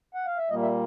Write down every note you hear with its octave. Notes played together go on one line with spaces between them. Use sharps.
F#5
F5
E5
A#2 G3 A#3 D#5
E5